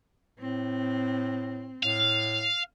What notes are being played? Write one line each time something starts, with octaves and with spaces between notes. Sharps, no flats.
A2 C4
A2 F5